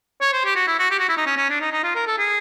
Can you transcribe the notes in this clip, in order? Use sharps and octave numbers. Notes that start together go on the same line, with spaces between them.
C#5
C5
G4
F#4
E4
F#4
G4
F#4
E4
D#4
C#4
C#4
D4
D#4
D#4
F4
A#4
A4
G#4